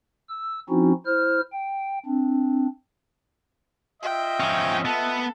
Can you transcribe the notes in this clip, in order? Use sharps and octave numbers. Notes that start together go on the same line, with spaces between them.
E6
F3 C4 C#4 D#4 E4 F#4
E4 C5 F6
G5
C4 D4
F4 D#5 E5 G5
F3 C#4
B3 A4